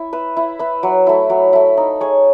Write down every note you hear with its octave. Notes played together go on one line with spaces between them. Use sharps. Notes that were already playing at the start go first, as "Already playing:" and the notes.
Already playing: E4
B4 E5
E4
B4 E5
F#3
A3 E4
F#3
A3 E4
D#4
G#4 C#5